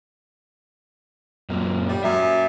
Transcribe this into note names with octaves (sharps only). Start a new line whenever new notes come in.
F#2 A#2 A#3
G3
F#2 E5